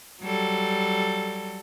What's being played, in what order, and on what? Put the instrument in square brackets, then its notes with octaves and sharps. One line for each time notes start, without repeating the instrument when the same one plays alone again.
[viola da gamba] F#3 G3 A4